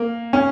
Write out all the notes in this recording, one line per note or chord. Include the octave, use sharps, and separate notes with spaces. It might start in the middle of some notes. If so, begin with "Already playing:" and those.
Already playing: A#3
C#4